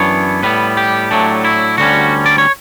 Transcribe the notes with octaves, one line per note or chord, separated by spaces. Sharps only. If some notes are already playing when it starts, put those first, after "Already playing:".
Already playing: F#2 E3 B3 D4 C#5
A2 G3 B3 B4
G4
A2 F#3 A3 D4
E4
D2 D3 G3 C#4 F#4
D5
C#5